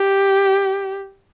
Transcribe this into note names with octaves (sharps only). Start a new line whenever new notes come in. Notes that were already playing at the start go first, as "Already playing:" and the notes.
Already playing: G4